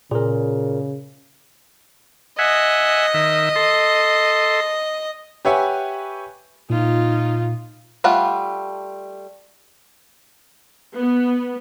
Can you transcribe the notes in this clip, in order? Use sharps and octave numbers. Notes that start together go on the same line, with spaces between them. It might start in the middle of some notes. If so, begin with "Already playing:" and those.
A#2 C#3 G#4 A#4
D#5 E5 F#5 G#5
D#3 E5
A4 C6
G4 B4 C#5 E5 F#5 G#5
A#2 D#4 F4
G3 A3 F4 F#5
B3